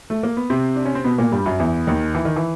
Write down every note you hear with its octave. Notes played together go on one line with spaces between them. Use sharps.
A3
A#3
B3
C3 C4
D4
C#4
C4
B2 B3
A#2 A#3
G2 G3
F#2 F#3
E2 E3
D#2 D#3
E3
D#3
E3